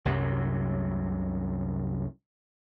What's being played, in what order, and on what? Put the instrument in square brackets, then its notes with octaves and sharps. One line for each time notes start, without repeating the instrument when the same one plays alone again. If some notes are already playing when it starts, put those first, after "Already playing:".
[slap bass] C2 F#2 C3 F#3